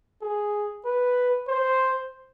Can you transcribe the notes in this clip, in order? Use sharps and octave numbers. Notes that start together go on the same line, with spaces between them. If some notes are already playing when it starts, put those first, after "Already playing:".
G#4
B4
C5